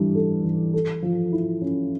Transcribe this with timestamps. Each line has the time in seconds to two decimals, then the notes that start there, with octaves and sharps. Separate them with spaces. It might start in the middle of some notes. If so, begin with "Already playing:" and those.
Already playing: E3 G3 D4
0.15 A4
0.44 E3
0.74 A4
1.02 F3
1.32 E4
1.62 C#4